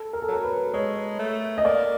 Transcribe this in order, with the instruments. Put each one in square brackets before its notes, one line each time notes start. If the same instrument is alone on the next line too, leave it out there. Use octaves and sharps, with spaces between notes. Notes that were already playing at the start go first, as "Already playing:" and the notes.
Already playing: [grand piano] A4
A#4
A4
[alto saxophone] F#3 [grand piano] A#4
[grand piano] B4
[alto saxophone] G#3 [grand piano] C#5
[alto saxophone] A3
[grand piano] D#5
[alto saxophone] A#3 [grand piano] D5